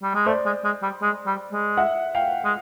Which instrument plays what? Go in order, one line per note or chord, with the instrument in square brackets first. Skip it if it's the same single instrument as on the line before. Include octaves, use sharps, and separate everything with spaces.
[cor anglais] G3
G#3
[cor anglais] A3 [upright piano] C5 D5
[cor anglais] G#3
G#3
G3
G#3
G3
G#3
[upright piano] E5 F#5
F5 G5
[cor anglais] G#3